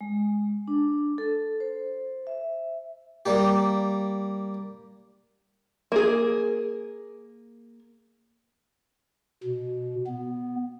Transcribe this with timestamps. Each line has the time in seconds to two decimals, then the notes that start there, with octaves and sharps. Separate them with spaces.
0.01 G#3
0.68 D4
1.18 A4
1.60 C5
2.27 E5
3.26 G3 A#3 G4
5.92 A#3 G#4
9.44 B2
10.07 B3